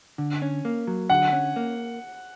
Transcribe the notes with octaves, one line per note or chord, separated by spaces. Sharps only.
D3
C#4
A#3
F#3
D3 F#5
C#4
A#3